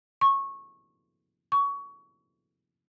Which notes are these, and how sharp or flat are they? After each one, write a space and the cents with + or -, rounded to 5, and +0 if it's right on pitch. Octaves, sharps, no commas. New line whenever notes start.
C#6 -15
C#6 +20